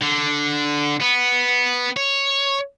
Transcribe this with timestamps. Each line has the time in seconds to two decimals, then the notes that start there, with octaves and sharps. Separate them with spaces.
0.02 D3
1.01 B3
1.96 C#5